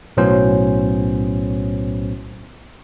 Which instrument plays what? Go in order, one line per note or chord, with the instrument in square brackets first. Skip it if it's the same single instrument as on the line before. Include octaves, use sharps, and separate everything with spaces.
[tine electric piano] B1 A2 F#3 B3 C#4 C5